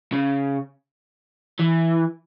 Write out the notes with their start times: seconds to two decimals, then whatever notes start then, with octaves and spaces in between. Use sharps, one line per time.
0.13 C#3
1.59 E3